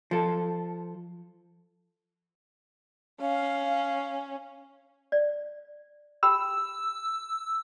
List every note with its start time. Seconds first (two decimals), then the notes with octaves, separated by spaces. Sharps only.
0.11 F3 A4
3.21 C#4 F5
5.12 D5
6.23 G4 G5 B5 E6